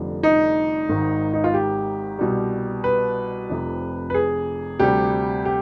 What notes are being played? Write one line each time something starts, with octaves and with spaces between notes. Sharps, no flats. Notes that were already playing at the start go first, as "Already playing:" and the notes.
Already playing: F1 F2 D3 G3
D#4
G#1 G#2 D#3
D#4
F4
G4
C2 B2 G3
B4
F1 F2 C3
B4
G#4
D2 C3 G3 G4
G4